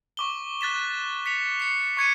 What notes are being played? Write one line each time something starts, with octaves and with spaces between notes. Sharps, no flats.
C#6 D6 G7
F#6 A6 B6 E7
B6 C#7 F7
C7 C#7
C#6 G#6 C#7 D#7